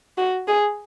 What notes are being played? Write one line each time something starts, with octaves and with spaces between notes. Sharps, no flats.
F#4
G#4